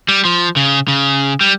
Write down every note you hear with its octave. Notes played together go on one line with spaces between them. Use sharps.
G3
F3
C#3
C#3
G3